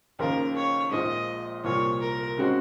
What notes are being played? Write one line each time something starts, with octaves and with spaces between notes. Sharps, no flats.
D#2 C#3 F3 A#3 F4 A#4
C#5
A#1 A#2 F3 G#3 D#5
C2 A#2 F3 A#3 C#5
A#4
C#3 G#3 C4 F#4